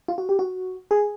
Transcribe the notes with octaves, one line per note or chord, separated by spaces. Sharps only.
F4
F#4
G4
F#4
G#4